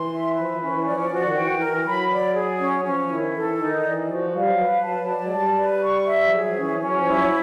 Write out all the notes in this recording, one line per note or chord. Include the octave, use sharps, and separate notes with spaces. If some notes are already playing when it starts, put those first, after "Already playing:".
Already playing: E3 C6
E5
F3 B4
E3
D#3 C#4
E3
F3 D5
F3
F3 F#4
D#3
E3 G5
E3
A#4
E3
F#3 B5
D5
G#4
C#4
F3 C#4
D#3 E4
E3 A4
D#3 D#4
E3 D5
F3 F#4
G3 F5
F#3
B4
F#3 A5
F#3
D5
F#3
G#3
G3 A5
B4
C#6
E5
F3
F#3 G#4
F3
E3 C#4
F#3 C#4
F3
G3 E4
F#3